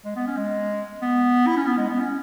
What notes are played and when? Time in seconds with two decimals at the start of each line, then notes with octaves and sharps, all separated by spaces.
0.05 G#3
0.16 B3
0.27 C#4
0.37 G#3
1.02 B3
1.47 E4
1.57 C#4
1.66 B3
1.78 G#3
1.89 B3
1.99 C#4